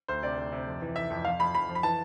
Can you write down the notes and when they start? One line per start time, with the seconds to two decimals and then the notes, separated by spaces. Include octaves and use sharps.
0.08 D2 C5
0.22 C3 D5
0.37 D2
0.52 C3
0.67 F2
0.82 E3
0.96 E3 E5
1.10 F2
1.25 F2 F5
1.40 F2 B5
1.54 F2 B5
1.69 F3
1.75 B5
1.83 E3 A5